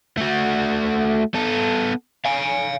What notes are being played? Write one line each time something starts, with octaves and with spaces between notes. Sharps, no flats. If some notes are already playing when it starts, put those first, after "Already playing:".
A3 F#4
B3 A4
F5 G#5